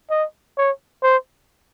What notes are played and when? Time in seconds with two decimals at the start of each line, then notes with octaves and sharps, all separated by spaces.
0.10 D#5
0.57 C#5
1.03 C5